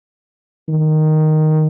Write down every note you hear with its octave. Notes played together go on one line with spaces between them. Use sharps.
D#3